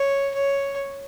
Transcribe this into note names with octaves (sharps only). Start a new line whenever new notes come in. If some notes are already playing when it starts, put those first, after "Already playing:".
Already playing: C#5
C#5